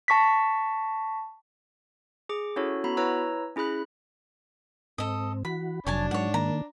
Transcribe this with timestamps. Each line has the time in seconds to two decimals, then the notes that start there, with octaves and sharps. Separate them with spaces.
0.08 A5 C#6 A#6 B6
2.29 G#4 D6
2.56 C#4 E4 F#4 A4 C#5
2.84 B3 F#4 A#5 B5
2.97 E4 B4 C#5 A#5 E6
3.56 C#4 E4 G#4 B5 F#6
4.98 G#2 C4 A4 D#5
5.45 E3 F#4 B5
5.87 F1 F#3 D4 C#5 G#5 A5
6.11 G#2 C#5 F#5
6.34 D#3 A#3 A#5